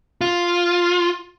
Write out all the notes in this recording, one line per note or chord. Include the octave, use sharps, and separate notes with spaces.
F4